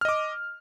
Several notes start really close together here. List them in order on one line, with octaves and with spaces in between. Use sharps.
F6 D#5 D6